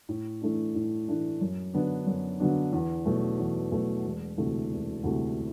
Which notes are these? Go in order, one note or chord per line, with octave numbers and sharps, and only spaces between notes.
A2
E3 A3 D4
A2
E3 A3 D4
F#2
D3 F#3 B3 D4
F#2
D3 F#3 B3 D4
E2
B2 F#3 A3
E2
B2 F#3 A3
E1
D2 C3 E3 A3
E1
D2 C3 E3 A3